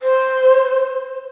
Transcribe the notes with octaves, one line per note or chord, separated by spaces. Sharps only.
C5